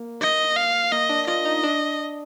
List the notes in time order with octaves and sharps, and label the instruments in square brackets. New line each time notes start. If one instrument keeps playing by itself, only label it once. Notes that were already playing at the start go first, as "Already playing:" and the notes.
Already playing: [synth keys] A#3
[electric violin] D#5
F5
[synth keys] A#3 [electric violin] D#5
[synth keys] D4
[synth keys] F4 [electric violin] D#5
[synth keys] D#4
D4